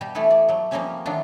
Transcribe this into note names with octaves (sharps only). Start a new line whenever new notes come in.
B2 G3 G4
E3 A3 B3 E4 A4 B4
D5
F#3 A3
F3 G3 A#3 C4 C#4 G4
D#3 E3 F#3 B3 D4 F4